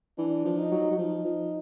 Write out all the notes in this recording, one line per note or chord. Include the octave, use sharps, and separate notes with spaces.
E3 D4
F3
D#4
F#3
F#3
F3 D#4
F3